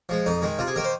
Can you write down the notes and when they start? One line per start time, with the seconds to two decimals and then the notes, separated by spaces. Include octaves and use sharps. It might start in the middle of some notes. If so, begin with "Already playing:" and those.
0.09 F3 G#3
0.26 F2 D#4
0.42 D#3 G#3
0.59 C3 F4
0.67 G#4
0.76 D#3 A#3 A#4
0.84 C5